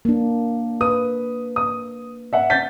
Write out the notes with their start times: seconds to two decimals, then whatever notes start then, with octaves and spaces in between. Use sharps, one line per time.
0.05 A#3 D4
0.81 B4 D#6
1.56 D#6
2.33 E5 F#5
2.50 G6 A6 B6